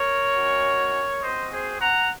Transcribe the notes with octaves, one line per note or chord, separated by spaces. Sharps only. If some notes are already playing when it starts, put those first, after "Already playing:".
Already playing: A#4 C#5
G#3 C#4 F#4
C4 F#4 C5 D#5
G#4 C5
F#5 A#5